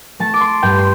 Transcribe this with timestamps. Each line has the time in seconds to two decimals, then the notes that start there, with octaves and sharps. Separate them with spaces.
0.20 A3 A5
0.34 D6
0.41 C6
0.63 G2 G5
0.79 C6